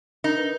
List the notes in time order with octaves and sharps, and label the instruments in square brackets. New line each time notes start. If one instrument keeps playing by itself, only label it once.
[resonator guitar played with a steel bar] D#4 [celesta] A#4
[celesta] B4